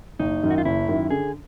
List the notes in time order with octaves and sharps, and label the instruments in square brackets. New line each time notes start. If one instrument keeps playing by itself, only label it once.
[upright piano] F#1 [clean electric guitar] D#4
[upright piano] F#2 D#3
[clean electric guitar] F#4
F4
[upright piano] F#1 [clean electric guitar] E4
[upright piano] F#2 D#3
[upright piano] D3 [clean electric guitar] G#4